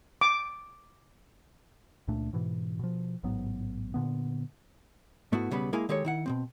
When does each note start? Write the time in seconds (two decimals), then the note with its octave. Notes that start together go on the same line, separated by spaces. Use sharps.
0.21 D6
2.08 C#2 A#2 A3 D4
2.33 G#2 B2 E3
2.79 B2 F3
3.23 A1 G#2 F#3 B3
3.94 A#2 D3 B3
5.32 G#2 A3 B3 E4 F#4
5.51 B1 C#3 G3 B3 B4
5.73 G#3 A#3 E4 G#4 F5 G#5
5.89 D#3 G#3 G4 A4 C#5
6.05 D#3 E4 F#5
6.26 B2 E3 C4